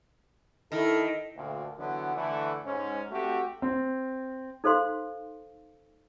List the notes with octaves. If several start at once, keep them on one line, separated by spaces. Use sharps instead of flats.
D#3 E4 A4
D2 A#2
D3 E3 F#3 B3
D3 E3 A3 E4
G#2 C#4
A3 C4 F#4 G4
C4
D#4 A4 C5 F5 C6